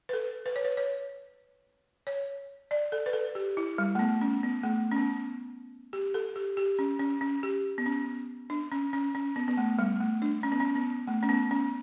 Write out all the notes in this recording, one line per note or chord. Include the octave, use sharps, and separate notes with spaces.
B4
A4
B4
C#5
B4
C#5
C#5
D5
A4
B4
A4
G4
E4
G3
A3
B3
C#4
B3
A3
C#4
B3
G4
A4
G4
G4
C#4
C#4
C#4
G4
B3
C#4
D4
C#4
C#4
C#4
B3
B3
A3
G3
A3
D4
C#4
B3
C#4
B3
A3
C#4
B3
C#4